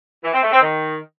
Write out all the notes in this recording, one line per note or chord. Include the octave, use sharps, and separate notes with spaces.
E3
C4
A3
C4
D#3